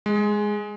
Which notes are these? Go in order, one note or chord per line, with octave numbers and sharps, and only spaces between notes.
G#3